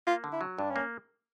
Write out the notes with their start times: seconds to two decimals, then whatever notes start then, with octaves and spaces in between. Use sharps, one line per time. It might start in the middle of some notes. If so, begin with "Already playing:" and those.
0.07 A#3 F4
0.24 D3
0.33 E4
0.41 F#3
0.58 G2 D4
0.70 C#4
0.76 A#3